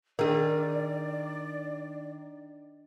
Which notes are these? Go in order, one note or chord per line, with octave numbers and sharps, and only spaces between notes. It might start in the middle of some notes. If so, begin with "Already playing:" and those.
D#3 D4 G#4 A#4 D5 D#5